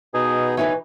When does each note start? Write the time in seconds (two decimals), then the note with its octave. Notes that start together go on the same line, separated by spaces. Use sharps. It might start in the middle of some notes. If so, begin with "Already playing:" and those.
0.14 B2 D#4 G#4
0.57 E3 D#4 B4 C#5